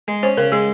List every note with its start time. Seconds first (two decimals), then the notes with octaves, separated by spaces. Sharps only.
0.08 G#3
0.23 C#4 C5
0.37 C#3 A#4
0.52 G#3 G#4